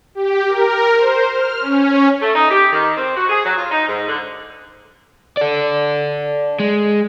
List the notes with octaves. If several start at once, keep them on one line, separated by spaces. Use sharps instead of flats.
G4
A#4
C5
F6
C#4
A3
D#4
G4
D#3
C4
F#4
G#4
F#3
F4
D#4
G#2
D3
A4 D5
G#3